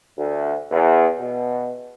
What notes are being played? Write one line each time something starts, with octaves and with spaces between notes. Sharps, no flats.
D2
E2
B2